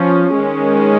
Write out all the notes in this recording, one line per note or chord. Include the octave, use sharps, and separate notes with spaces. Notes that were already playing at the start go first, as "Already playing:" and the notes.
Already playing: F3 C#4
D#3 G#3 C#4